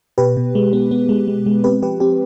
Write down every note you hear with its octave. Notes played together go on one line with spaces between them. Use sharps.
B2 G4 B4
B2
G#3
B3
B3
G#3
G#3
G#3
C4 G4 B4
F3 G4 B4
C4 G4